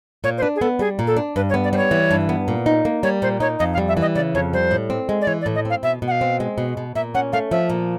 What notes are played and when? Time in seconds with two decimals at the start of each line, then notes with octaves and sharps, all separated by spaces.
0.24 A#2 C#5
0.38 C5
0.42 D4 B4
0.56 G#4
0.61 B3 A4
0.79 G3 G#4
0.99 A#2
1.07 A4
1.17 D4
1.36 G2 B4
1.49 C#5
1.54 B3
1.64 D5
1.73 G3 C5
1.77 C#5
1.91 E3
2.11 G2
2.29 B3
2.48 A#2
2.66 D#4
2.85 A#3
3.03 G3 C#5
3.22 A#2 C5
3.40 D#4 C#5
3.59 F2 D#5
3.73 F5
3.78 G3
3.88 E5
3.97 E3 D#5
4.15 C#3 D5
4.34 F2 C#5
4.53 G3 C5
4.71 A2
4.90 C4
5.09 G#3
5.21 D5
5.27 E3 C#5
5.41 D5
5.46 A2
5.55 D#5
5.65 C4 F5
5.83 B2 E5
6.02 B2
6.07 F#5
6.11 F5
6.21 C4
6.40 G#3
6.58 B2
6.77 B2
6.95 A#2 E5
7.14 C#4 F#5
7.33 A3 F5
7.51 F3 E5
7.69 A#2